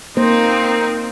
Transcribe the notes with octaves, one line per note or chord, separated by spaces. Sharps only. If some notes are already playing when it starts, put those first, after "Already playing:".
A#3 C4 D#4 C5